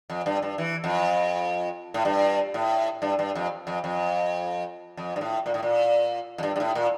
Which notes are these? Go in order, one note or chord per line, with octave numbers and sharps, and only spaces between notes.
F2
G2
G2
E3
F2
A2
G2
A2
G2
G2
F2
F2
F2
F2
G2
A2
A#2
A2
A#2
F2
G2
G2
A2
A#2